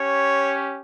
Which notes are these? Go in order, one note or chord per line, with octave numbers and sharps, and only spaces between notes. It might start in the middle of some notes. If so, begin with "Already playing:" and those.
Already playing: C#4 G4 C#5